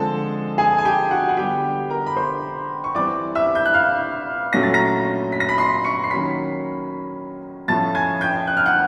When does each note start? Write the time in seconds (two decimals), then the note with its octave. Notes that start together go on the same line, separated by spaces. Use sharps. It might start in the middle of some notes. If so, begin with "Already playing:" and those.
Already playing: D3 F3 G#3 C4 A4 A5
0.58 G#4 G#5
0.78 G#5
0.85 G4 G5
1.11 F#4 F#5
1.29 F#5
1.37 D3 G3 B3 G4 G5
1.90 A#4 A#5
2.07 B5
2.17 C5 C6
2.84 C#6
2.95 E3 G3 C4 D5 D6
3.35 E5 E6
3.55 G6
3.65 F#6
3.74 F5 F6
4.53 A#2 F#3 A3 C#4 A#6
4.63 A6
4.74 A#5 A#6
5.32 B6
5.40 A#6
5.49 B5 B6
5.58 C6 C7
5.84 C#6 C#7
6.04 C7
6.11 D#3 F#3 A#3 C#4 B5 B6
7.68 A2 F3 A3 C#4 A5 A6
7.95 G#5 G#6
8.21 G5 G6
8.47 F#6
8.57 F6
8.66 F#5 F#6